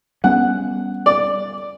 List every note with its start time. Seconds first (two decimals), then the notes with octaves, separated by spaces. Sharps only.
0.24 G3 B3 C#4 F#5
1.06 D5